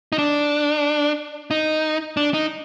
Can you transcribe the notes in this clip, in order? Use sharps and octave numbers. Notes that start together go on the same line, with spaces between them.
D#4
D4
D#4
D4
D#4